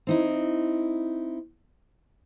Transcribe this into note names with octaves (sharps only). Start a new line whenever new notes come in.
C4 D#4 E4